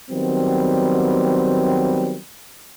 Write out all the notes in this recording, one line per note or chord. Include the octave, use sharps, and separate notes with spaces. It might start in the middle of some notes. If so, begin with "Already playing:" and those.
D#3 F#3 G3 B3 C4